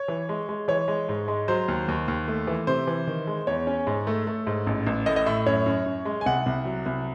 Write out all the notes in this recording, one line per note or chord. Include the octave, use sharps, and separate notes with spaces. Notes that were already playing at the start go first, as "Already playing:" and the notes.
Already playing: C#5
E3
G#3
G#3
E3 C#5
G#3
G#2
G#3
F#3 C5
D#2
D#2
D#2
A3
E3
C3 C5
E3
D#3
G#3
E2 C#5
C#4
G#2
A3
A3
G#2
A1
A1
A2 D#5
D#5
A2 E5
F#2 C#5
F#2
F#2
G#3
G#5
C2 F#5
C2
F#3
C2